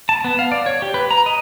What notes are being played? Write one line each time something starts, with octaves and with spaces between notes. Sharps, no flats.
A5
B3
F5
D5
C#5
G4
B4
A#5
D#5